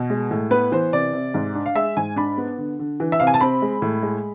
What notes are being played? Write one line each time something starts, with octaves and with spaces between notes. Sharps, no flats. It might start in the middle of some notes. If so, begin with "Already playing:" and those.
Already playing: B2
G#3
A2
B3 B4
E3 C5
C3 D5
C3
G#2
D4
F5
G#3 E5
G#2 G#5
D4 B5
B3
D3
D3
E3
E5
C3 F5
G#5
A5
C4 B5
G#3
A2
G#3